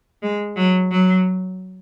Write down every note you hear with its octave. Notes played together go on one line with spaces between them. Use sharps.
G#3
F#3
F#3